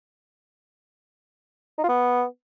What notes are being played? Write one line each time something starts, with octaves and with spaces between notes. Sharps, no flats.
D#4
F4
B3